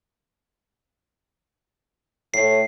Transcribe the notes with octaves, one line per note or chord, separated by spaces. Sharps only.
A2 C7